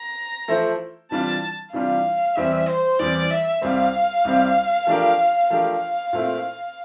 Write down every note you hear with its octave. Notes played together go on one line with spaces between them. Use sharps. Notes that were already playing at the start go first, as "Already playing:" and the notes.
Already playing: A#5
F3 A3 E4 A4 C5
C3 E3 G3 D4 F4 A5
C3 E3 G3 D4 F4 F5
E2 E3 G3 C4 E5
C5
E2 E3 G3 C4 D5
E5
C2 C3 G3 C4 F5
C2 C3 G3 C4
F3 A3 D4 G4 A#4
F3 A3 D4 G4 A#4 F5
A#2 A3 C4 E4